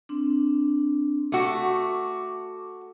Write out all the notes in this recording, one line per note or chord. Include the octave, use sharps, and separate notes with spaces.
C4 D4
A3 F#4 D6